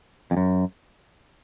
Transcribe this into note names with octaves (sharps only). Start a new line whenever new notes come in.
F2
F#2